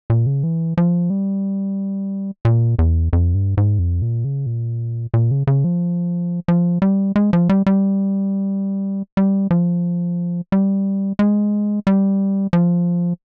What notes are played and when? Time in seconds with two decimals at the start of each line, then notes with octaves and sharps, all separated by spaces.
0.10 A#2
0.26 C#3
0.43 E3
0.77 F3
1.10 G3
2.45 A#2
2.79 E2
3.13 F2
3.35 G2
3.57 G#2
3.79 F2
4.02 A#2
4.24 C#3
4.46 A#2
5.14 A#2
5.31 C#3
5.47 C#3
5.64 F3
6.48 F3
6.82 G3
7.16 G#3
7.33 F3
7.49 G3
7.66 G3
9.17 G3
9.51 F3
10.52 G3
11.19 G#3
11.87 G3
12.53 F3